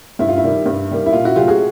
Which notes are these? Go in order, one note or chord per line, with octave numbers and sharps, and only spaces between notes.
G2 E4
F4
E4
D#3 G3 A#3
G2
D#3 G3 A#3
E4
A#2 F4
E4 F#4
F#3 A3 F4 G4
F#4 G#4